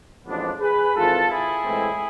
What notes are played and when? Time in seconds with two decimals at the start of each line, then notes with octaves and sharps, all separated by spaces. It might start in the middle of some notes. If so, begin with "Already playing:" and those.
0.26 A1 G#2 F3 B3 D4
0.60 G#4 B4
0.95 G#1 G#2 E3 F4 A4
1.30 E4 G#4
1.64 A2 E3 G#3 C4